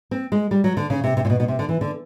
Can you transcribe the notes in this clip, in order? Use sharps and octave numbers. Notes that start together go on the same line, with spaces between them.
C4
G#3
G3
F#3
D3
C#3
C3
C3
A#2
B2
B2
C3
D3
E3
D3